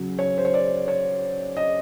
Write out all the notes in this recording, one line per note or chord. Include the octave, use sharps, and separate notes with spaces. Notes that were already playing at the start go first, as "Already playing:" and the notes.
Already playing: C#3 F#3
C#5
C5
C#5
D5
C#5
D#5